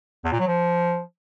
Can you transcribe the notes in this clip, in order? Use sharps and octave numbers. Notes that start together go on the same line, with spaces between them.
E2
A#2
F#3
F3